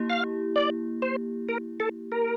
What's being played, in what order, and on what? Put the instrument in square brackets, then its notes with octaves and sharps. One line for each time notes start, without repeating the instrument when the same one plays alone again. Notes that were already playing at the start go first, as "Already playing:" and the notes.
Already playing: [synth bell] A#3 E4 G4
[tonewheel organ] F5
D5
C5
A#4
A4
A#4